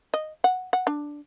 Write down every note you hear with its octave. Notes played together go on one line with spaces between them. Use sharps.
D#5
F#5
F#5
D4